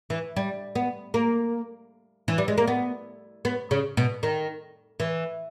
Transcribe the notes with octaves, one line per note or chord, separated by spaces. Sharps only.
E3
G3
B3
A#3
E3
G3
G#3
A#3
B3
B3
C#3
B2
D#3
E3